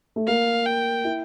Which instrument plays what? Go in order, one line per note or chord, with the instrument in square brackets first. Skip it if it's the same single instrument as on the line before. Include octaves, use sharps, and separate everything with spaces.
[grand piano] A3
[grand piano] A#3 [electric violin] F5
[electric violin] G5
[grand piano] E4